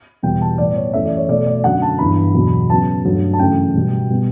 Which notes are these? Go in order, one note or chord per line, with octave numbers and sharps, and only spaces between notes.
E2 B2 G3 B3 G5
A5
A2 G3 B3 D5
C#5
F#2 E3 A3 E5
D5
C#5
B2 A3 D5
D5
F#2 D3 F#3 F#5
A5
G2 E3 B3 B5
E2 B2 F#3
C#3 F#3 B3 A5
G2 F#3 A3
A5
F#2 C#3 E3 A3 G5
B2 G3 B3
B2 G3 B3